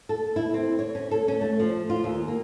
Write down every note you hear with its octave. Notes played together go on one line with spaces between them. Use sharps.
A4
E4
C4
C#5
C#4
A4
C#4
A3
F3
F4
D#2
A#3